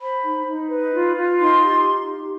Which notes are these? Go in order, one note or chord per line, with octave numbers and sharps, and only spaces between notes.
C5 B5
D#4
D#4
B4
F4
F4
D#4 C6
G4
D#4
G4